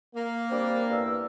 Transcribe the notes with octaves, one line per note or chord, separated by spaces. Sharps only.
A#3
G3 C4 D4
E2 G2 E6